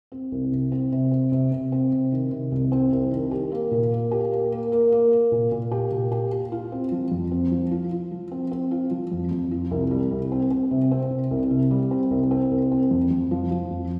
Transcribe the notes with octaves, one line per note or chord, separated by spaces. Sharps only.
C4
C2
C3
C4
C3
C4
C3
C3
C4
C3
D#3
C3
C2
C4
C2
D#3
G4
A#3
A#2
A#3
G4
A#3
A#3
A#3
A#3
A#3
A#2
A#2
G4
A#2
G4
G4
F4
C4
F3
F2
C4
F3
F4
F4
F3
C4
C4
F4
F3
F2
F2
F4
C2
G3
C2
C4
C4
C3
C4
C3
C2
C3
G3
C4
C2
C4
C2
C4
F2
F2
F3
F3
F2